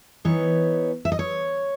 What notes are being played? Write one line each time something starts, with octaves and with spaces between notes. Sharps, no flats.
E3 B3 D#4 C#5
E5
D#5
C#5